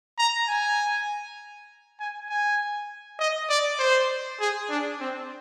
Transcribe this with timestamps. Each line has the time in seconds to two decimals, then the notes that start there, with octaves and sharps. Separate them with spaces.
0.18 A#5
0.48 G#5
2.00 G#5
2.30 G#5
3.19 D#5
3.49 D5
3.79 C5
4.40 G#4
4.69 D4
5.00 C4